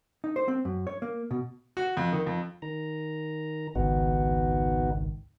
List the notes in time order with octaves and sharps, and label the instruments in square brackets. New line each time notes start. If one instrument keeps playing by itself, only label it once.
[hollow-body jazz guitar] D#4
C5
C4
F#2
C#5
A#3
B2
[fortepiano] F#4
F2
D#3
F2
[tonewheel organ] D#3 A#5
[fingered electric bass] G#1 C#2 D#3 [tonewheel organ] B3 D#4 F#4